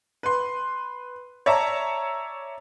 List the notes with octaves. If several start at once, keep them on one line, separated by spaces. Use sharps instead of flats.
B4 C6
C#5 D5 E5 A5 A#5